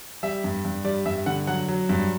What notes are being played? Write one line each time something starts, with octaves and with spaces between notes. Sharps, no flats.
G3 E5
G2
G2
G3 D5
G2 E5
D3 F#5
F#3 F#5
F#3
G2